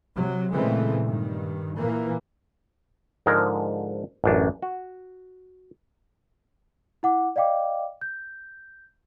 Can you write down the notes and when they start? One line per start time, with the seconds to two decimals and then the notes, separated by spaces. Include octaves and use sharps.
0.15 C3 F#3
0.53 A#2 C#3 E3 G#3 A3 C4
1.05 G2 D#3
1.78 A#2 E3 A#3
3.26 G#2 D3 F3 G#3 A#4
4.24 A1 F#2 D4
4.62 F#4
7.03 E4 F#5 D6
7.36 D5 D#5 F5 G5 D6
8.01 G6